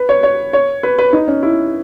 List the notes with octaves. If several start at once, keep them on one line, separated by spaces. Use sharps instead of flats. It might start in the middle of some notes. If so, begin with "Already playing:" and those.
Already playing: B4
C#5
C#5
C#5
B4
B4
D#4
C#4
E4